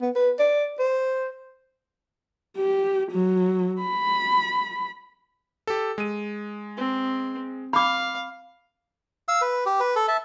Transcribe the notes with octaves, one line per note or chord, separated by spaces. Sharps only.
B3
B4
D5
C5
G4
F#3
B5
G4 A4
G#3 D#7
C4
F5 B5 D6
F5 E6
B4
G4
B4
A4
E5 A5